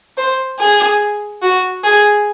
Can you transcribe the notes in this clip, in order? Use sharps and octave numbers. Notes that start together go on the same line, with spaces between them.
C5
G#4
F#4
G#4